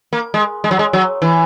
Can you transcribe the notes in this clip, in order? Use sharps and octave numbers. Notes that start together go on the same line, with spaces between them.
A#3
G#3
G#3
F#3
G#3
F#3
E3